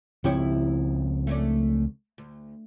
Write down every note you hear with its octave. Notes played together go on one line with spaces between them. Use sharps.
C#2 F3 C4 E4 G4 C#5
A3 C#4 D4
D2